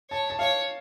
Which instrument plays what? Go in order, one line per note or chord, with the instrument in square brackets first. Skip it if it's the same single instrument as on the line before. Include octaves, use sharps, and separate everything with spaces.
[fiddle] C#5 [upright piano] A5
[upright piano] A5
[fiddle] C#5 [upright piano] F5